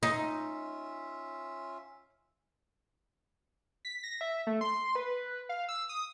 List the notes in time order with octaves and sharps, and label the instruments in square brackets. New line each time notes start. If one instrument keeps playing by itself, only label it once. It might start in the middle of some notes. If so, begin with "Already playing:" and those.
[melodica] C#4 F4 E5 [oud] D#4
[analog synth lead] B6
A#6
E5
A3
C6
B4
F5
E6
D#6